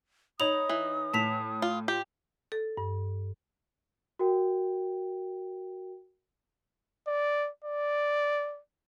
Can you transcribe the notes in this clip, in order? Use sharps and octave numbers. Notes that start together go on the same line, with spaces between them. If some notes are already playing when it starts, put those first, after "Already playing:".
D#4 C#5 B5 D#6 F7
E3
A2 A5 B6 F7
F4
F4 G4
A4
G2
F#4 A#4 G5
D5
D5